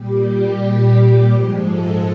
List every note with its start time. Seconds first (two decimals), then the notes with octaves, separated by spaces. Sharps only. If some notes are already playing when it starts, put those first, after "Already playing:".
Already playing: A#2 G3 G4
0.27 G4
1.30 G#2 F3 G#3
1.65 A4